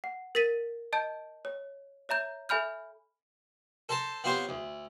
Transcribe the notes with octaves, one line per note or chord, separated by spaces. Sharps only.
F#5
A#4 A6 B6 D#7
D#5 A5 G6 D7
C#5
C#5 E5 A#5 G6
A4 E5 G#5 B5 F6 G6
A4 C5 A5 A#5
B3 C4 F4 G4 C5 C#5
D2